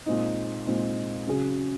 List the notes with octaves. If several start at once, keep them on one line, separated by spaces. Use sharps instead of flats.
A#2 G#3 C4 D#4
A#2 G#3 C4 D#4
C#3 F#3 C#4 G#4